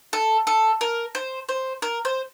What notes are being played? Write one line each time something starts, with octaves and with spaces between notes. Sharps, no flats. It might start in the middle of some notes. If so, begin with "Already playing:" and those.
A4
A4
A#4
C5
C5
A#4
C5